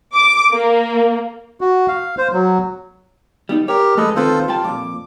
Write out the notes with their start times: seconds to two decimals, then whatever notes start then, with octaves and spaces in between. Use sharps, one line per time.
0.15 D6
0.53 A#3
1.61 F#4
1.88 F5
2.18 C5
2.32 F#3
3.49 G3 B3 D#4
3.68 G4 A#4 C#5
3.97 F3 G#3 A3 A4 B4 D#5
4.16 D#2 C4 F4 A4 B4 C5
4.48 G3 F4 G5 A5
4.64 F2 A#2 D6